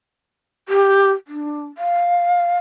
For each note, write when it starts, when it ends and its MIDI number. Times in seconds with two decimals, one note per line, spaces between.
0.69 1.11 67
1.28 1.67 62
1.78 2.58 77